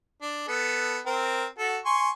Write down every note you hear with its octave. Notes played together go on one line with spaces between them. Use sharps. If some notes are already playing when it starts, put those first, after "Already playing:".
D4
B3 A4
C4 A#4
F#4 A4
G#5 C6 C#6